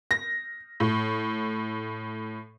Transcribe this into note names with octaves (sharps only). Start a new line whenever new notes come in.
A#6
A2